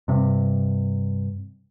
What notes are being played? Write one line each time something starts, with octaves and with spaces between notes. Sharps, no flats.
G2 C3